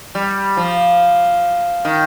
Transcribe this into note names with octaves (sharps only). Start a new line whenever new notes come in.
G3
F3
D#3